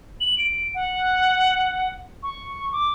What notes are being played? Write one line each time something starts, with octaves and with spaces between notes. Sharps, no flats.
F#7
D7
F#5
C#6
D6